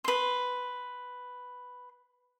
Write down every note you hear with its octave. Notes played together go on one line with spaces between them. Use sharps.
B4 C6